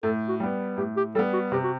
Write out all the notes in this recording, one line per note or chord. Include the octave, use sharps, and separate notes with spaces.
A2 A4
F#4
G3 B3
A2 G4
G4
G3 B3 A4
F#4
C3 G4
F#4